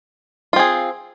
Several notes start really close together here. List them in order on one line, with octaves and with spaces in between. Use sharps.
F4 C4 G#4